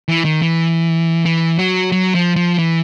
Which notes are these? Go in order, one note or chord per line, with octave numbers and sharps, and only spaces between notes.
E3
D#3
E3
E3
F#3
F#3
F3
F3
E3